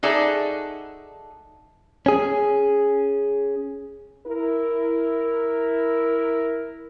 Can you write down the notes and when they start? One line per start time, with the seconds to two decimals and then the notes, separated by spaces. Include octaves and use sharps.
0.03 D#4 F#4 G#4 A4 D5 E5
2.06 C#4 G#4
4.26 E4 A#4